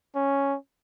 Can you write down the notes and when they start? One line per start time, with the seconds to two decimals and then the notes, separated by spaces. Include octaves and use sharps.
0.15 C#4